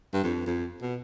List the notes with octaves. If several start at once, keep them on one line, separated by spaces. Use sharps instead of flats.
G2
F2
F2
B2